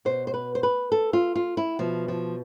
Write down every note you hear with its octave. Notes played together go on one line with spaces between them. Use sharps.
B2 C5
C5
B4
C5
B4
A4
F4
F4
E4
B2 F3
F3